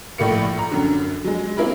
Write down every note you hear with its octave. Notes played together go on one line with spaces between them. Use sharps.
A#1 A2 A#3 C#7
A#5
F#2 D3
F#3 G#3
A#3 C4 E4 A#4 B4